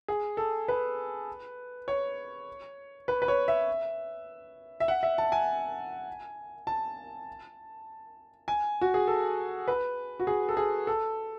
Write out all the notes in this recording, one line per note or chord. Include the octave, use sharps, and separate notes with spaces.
G#4
A4
B4
C#5
B4
B4
C#5
E5
E5
F#5
E5
A5
G#5
A5
G#5
F#4
G#4
A4
B4
F#4
G#4
A4
G#4
A4